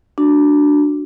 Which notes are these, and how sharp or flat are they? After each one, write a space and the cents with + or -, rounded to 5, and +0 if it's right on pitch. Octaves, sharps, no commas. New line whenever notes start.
D4 +0 F#4 +0